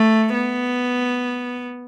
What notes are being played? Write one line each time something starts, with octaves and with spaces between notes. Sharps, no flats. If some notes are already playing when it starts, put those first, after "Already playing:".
Already playing: A3
B3